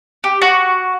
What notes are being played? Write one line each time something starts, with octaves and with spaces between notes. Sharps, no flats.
G4
F#4